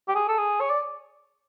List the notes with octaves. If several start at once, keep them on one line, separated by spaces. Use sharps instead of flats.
G4
G#4
A4
G#4
C#5
D5